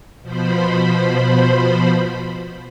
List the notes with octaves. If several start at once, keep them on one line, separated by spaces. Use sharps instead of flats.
B2 F3 C5 B5